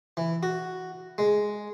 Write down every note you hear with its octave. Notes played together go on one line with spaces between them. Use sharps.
E3
F#4
G#3